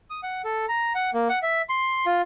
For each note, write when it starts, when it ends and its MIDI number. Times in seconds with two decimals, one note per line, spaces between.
0.10 0.21 87
0.23 0.42 78
0.45 0.66 69
0.68 0.93 82
0.95 1.10 78
1.14 1.28 58
1.29 1.39 78
1.43 1.62 76
1.69 2.06 84
2.06 2.22 65